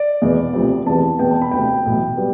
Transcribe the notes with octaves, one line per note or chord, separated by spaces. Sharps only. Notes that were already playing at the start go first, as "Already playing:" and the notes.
Already playing: D5
E2 B2 B3
D2 C3 F3
E2 C3 E3 B3 A5
E2 B2 B3 G5
A5
B5
E1 D2 C3 G5
B1 A2 E3
G3 B3